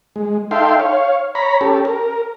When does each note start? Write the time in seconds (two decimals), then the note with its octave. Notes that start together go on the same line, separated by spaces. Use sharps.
0.16 G#3
0.51 D#4 A4 E5 F5 G5 C6
0.80 C#5 F5
1.35 C#5 A#5 B5
1.61 C#4 G4 A4
1.85 A#4